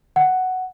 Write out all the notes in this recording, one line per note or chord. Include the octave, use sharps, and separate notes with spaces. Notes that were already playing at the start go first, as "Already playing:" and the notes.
F#5